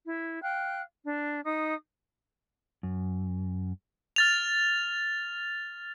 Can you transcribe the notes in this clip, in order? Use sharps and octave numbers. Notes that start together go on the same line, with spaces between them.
E4
F5 G5 F#6
D4
D#4 D#6
F#2
F6 A6 F7